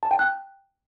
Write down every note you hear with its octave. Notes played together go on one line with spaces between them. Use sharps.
A5
G5
F#6